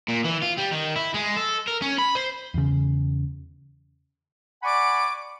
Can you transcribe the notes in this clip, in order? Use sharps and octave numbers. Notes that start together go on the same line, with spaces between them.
A#2
E3
F4
G3
D#3
E4
G#3
A4
A#4
C#4
B5
C5
E2 C#3
D5 F#5 G#5 B5 C#6 D6